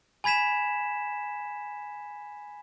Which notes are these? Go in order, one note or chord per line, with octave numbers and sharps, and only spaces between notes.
G#5 B5 G#6 B6 E7